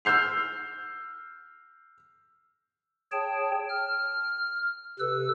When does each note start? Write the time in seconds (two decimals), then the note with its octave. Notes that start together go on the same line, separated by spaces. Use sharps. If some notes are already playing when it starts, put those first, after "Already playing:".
0.05 E6 F6 G6 C7 F7
3.12 G#4 C#5 G5 A5
3.69 F6
5.00 C3 A4 B4 E6